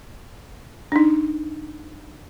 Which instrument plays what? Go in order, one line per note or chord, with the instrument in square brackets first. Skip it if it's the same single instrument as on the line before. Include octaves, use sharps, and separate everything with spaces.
[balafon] D4 D#4